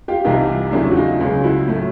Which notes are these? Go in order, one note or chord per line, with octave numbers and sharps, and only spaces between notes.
F4 G4
C2 C3 E3 G3 D#4 F4
E2 C#3 F#3 A3 D4 E4
F#4
D#4 F4
C#2 C#3 F#3
E4 F#4
A2 F#3 A3